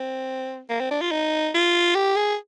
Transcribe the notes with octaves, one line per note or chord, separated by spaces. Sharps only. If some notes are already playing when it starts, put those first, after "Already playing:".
Already playing: C4
A#3
C4
D4
F4
D#4
F4
G4
G#4